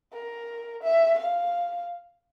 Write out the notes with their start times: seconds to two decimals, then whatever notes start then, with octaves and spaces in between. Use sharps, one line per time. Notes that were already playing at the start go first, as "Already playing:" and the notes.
0.13 A#4
0.83 E5
1.19 F5